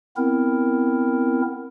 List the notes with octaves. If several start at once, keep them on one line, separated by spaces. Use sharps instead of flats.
B3 C4 E4 A#4